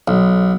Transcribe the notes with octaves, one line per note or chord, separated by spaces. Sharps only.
B1